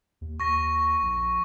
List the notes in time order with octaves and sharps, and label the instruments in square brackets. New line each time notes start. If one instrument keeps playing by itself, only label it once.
[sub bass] D#2
[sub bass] D#2 [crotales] C#6 A#6
[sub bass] A#1